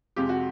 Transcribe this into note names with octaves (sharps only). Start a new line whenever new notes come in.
F2 C3 F3 G#3 G4
F#4